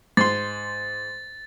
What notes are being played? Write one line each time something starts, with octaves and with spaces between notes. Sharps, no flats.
G#2 C6 A6